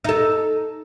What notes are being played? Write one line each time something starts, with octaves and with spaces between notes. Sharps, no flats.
D#4 A4